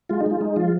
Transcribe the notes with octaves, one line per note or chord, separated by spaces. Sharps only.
G#3 F4
D#4
G#3 F4
G#3 D#4
F3 F4